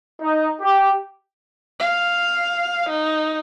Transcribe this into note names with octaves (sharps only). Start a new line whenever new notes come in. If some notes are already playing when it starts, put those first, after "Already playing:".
D#4
G4
F5
D#4